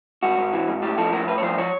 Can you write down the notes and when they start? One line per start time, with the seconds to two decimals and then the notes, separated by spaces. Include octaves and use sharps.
0.23 G#2 F#4
0.38 G#2
0.53 E3
0.68 G#2
0.82 A2 G4
0.98 F3 A4
1.13 A2 A#4
1.28 A2 B4
1.38 C#5
1.42 F3 C5
1.58 F3 C#5